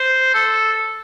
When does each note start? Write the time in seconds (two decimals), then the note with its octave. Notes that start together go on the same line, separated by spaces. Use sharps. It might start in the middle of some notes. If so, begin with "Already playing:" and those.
Already playing: C5
0.34 A4